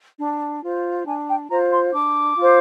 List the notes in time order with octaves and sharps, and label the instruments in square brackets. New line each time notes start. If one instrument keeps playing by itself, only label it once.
[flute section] D4
F4 C5
D4 G#5
G5
F4 C5 A#5
C6
D4 D6
F4
C5